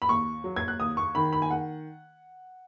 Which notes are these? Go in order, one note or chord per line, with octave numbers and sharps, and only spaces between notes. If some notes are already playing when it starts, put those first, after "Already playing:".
B5
D#2 C#6
F#3
G#6
F#6
D#2 D#6
C#6
D#3 B5
B5
G#5
F#5